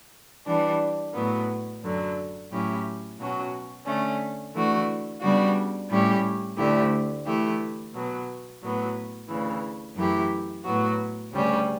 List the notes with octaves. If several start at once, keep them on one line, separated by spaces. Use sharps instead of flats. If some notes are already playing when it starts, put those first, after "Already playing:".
E3 G3 D4
A2 F#3 B3
F#2 D3 F#3
A2 F#3 C#4 E4 G4
B2 F#3 C#4 F#4
D3 A3 C#4
E3 A3 D4 F#4
C#3 G3 B3 D4 F#4
A2 G3 C#4 E4 G4
D2 D3 A3 E4 G4
E3 A3 E4 G4
B2 F#3 B3
A2 F#3 B3
D2 C#3 E3
F#2 E3 A3 E4 G4
A2 F#3 B3 F#4
D2 C#3 G3 C#4 G4